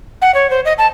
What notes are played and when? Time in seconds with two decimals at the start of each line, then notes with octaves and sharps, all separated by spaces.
0.22 F#5
0.34 C#5
0.50 C5
0.65 D#5
0.78 A5